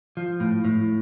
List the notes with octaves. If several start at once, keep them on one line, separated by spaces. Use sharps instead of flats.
F3
A2
A2